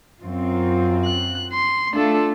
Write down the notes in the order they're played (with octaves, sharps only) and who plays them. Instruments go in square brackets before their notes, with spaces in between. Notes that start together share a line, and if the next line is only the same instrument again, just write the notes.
[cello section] F#2 C4 F4
[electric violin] F#6
C6
[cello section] A3 F4 [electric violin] D4 A4